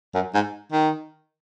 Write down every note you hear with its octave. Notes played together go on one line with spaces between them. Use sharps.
F#2
G#2
D#3